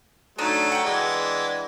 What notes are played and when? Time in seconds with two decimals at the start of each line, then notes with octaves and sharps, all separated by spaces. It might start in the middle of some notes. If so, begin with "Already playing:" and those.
0.38 F#3 A3 D4 D#4
0.72 F#5 G5
0.85 E3 G#3 D4